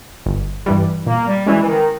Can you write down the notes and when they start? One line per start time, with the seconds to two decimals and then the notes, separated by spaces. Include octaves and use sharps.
0.26 G1
0.66 G2 E3 G3
1.06 A#2 A#3
1.27 G3
1.46 E3 G#3 C#4 E4
1.61 E3
1.67 D#3